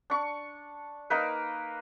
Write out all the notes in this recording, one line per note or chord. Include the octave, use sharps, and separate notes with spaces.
D4 C#6
A#3 D#4 B4